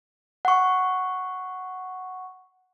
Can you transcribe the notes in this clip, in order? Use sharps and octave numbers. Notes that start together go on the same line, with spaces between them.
F#5 C#6